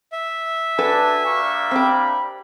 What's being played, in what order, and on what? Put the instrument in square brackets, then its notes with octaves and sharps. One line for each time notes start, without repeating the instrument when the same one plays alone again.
[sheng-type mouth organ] E5
[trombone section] D4 [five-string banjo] F#4 A4 B4 [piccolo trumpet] G#5
[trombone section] G3 A#3 D4 [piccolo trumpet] C#6
[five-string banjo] C4 G4 [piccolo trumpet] B5